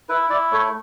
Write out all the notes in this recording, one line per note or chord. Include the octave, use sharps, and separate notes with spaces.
E4 B4
E4 D5
A3 C#5